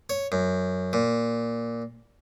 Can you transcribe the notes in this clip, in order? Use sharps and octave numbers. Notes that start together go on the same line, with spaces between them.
C#5
F#2
A#2